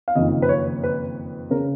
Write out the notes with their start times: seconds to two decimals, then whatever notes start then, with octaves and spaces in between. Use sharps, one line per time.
0.08 F5
0.15 F#1 F2 D#3 D#5
0.42 B4
0.49 C#5
0.84 B4
1.50 C#3 A#4